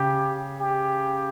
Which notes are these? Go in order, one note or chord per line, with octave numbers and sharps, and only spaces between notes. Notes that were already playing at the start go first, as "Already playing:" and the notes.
Already playing: C#3 G4
G4